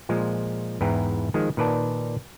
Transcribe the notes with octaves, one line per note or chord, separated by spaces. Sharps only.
A#2 F3 G#3
E2 G#2 E4 B4 G5 A#5
D#3 F3 G#3
A#2 D#3 B4 D5 A5